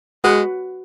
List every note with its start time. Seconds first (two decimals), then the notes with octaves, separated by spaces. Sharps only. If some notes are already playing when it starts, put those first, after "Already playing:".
0.24 G#3 F#4 B4 F#5